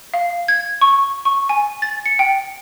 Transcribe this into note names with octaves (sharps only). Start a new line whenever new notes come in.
F5
G#6
C#6
C#6
G#5
A6
C#7
G5